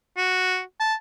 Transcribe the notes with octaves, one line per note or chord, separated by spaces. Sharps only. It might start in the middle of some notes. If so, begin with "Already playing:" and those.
F#4
A5